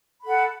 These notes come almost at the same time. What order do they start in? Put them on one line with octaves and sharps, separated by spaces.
B5 A4 F#5